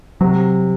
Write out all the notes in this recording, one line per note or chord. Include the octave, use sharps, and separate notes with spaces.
C3 F#3